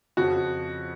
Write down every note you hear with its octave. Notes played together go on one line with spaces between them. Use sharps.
F2 C#3 F3 F#4